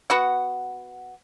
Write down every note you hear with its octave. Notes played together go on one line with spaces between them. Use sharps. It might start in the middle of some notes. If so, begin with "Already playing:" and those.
B3 F#4 F#5